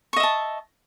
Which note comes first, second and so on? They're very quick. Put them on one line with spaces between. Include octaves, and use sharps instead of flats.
C#6 D#5 E5 A5